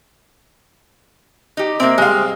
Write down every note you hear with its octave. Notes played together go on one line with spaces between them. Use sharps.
D#4 G4
A#3 C4 E5
G3 G#3 C4 F5